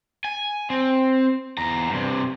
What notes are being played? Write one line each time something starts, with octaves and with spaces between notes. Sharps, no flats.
G#5
C4
E2 A#5
G2 C3